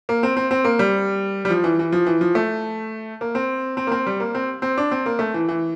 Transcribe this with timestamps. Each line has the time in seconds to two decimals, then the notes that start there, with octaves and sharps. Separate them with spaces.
0.09 A#3
0.23 C4
0.37 C4
0.51 C4
0.64 A#3
0.79 G3
1.45 G3
1.50 F3
1.64 E3
1.79 E3
1.92 F3
2.07 E3
2.21 F3
2.35 A3
3.21 A#3
3.35 C4
3.77 C4
3.87 A#3
3.92 C4
4.07 G3
4.20 A#3
4.35 C4
4.62 C4
4.78 D4
4.91 C4
5.06 A#3
5.19 A3
5.34 E3
5.49 E3